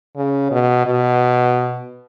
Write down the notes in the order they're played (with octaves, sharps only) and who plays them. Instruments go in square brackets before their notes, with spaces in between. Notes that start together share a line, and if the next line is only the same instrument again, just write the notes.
[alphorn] C#3
B2
B2